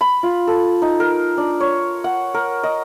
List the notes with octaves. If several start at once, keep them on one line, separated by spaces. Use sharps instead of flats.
B5
F4
A4
D#4
A#4
D4
C#5
F#5
A#4
D#5